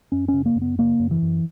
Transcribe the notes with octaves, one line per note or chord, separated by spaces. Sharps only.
F#2 C#4
C#4
C#3
A#3
F#2
B3
C#3 A#3
F#2
E3
F#2